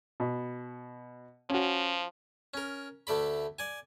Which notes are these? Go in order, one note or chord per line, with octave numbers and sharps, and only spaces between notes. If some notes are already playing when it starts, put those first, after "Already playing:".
B2
F3 C#4 F#4
C#4 A#4
D2 A3 D5 B5
D5 G#5